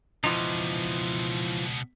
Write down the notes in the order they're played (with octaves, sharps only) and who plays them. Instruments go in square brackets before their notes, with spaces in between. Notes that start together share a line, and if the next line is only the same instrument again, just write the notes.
[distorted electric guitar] C#2 B2 [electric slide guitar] E3 F3 D#4